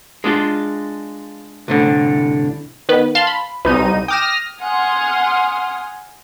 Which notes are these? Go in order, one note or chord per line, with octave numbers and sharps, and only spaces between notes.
G#3 D4 F4
C2 A2 D3
D#3 B3 B4
F5 A5 C6
B5
C2 D#4 B4 D#7
G5 D6 D#6 F6 A#6 E7
F#5 G#5 C6 D#6 F6